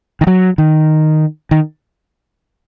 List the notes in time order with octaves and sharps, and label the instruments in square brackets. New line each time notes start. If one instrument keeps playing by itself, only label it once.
[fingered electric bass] D#3
F#3
D#3
D#3